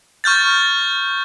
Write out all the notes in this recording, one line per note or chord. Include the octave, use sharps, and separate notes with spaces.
C#6 F6 G6 A6